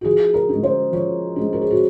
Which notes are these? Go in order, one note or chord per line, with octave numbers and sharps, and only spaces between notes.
F#4
F3 G#4
A#4
G#3 C#4
C5
F3 C#5
G#3 C#4
A#4
G#4
F#4